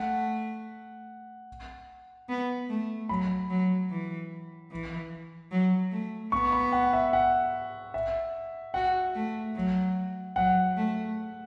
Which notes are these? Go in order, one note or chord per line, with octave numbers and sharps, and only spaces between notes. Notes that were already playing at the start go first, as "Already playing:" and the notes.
Already playing: A3 F#5
B3
A3
F#3 B5
F#3
E3
E3
F#3
A3
B3 C#6
B5
F#5
E5
F#5
E5
F#4 F#5
A3
F#3
F#3 F#5
A3